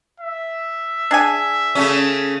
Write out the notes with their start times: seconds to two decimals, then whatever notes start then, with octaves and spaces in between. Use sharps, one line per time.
0.20 E5
1.11 D4 G#4 G#5
1.75 C#3 A3 C#4